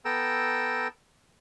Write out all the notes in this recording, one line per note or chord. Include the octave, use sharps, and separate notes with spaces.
B3 A4 G5 A#5 E6